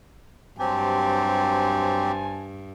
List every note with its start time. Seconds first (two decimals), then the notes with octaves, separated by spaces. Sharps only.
0.59 G2 F#3 C4 G4 C5 G#5 A5